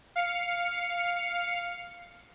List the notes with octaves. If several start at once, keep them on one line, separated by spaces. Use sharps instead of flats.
F5 C#7